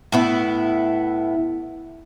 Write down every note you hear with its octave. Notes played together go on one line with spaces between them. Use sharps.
A2 B3 E4